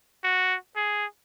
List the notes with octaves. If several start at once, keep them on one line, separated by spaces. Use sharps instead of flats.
F#4
G#4